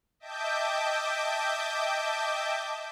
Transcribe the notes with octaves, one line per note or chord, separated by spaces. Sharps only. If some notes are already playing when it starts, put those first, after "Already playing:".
D#5 E5 G5 A5 D6 G6